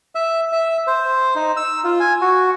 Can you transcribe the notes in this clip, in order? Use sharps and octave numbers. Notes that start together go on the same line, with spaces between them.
E5
E5
C5
D#4
E6
F4
G#5
F#4